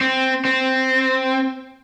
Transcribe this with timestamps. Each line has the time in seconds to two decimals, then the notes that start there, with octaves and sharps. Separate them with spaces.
0.01 C4
0.45 C4